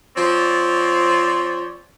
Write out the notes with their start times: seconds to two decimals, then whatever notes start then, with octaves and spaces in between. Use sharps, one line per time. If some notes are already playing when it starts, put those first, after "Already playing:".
0.17 F3 C4 C#5 D5